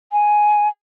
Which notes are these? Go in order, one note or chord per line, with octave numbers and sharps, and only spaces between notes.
G#5